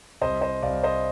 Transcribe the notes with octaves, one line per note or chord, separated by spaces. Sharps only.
C2 C5 D#5
C5 D#5
C2 D5 F5
C5 D#5